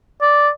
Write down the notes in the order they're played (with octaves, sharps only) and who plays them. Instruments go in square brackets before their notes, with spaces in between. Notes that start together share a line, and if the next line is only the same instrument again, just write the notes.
[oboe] D5